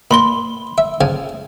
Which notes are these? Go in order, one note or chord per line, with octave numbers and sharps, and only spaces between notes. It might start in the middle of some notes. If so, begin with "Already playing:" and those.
A#2 B5 C6 G7
E5
C#3 F3 G#5